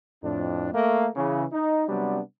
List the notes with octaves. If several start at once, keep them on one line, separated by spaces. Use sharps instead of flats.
F2 A2 D4
A3 A#3
C#3 E3
D#4
C3 F#3 G3 B3 C4 D4